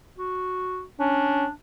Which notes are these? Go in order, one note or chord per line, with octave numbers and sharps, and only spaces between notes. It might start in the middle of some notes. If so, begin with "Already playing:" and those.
F#4
C#4 D4